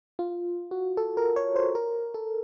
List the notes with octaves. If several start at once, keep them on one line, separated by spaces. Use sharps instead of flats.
F4
F#4
A4
A#4
C#5
C5
A#4
A4